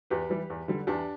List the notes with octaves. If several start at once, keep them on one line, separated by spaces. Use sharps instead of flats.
E2 G4 B4
E3 G3
E2
D3 G3
E2 D4 G4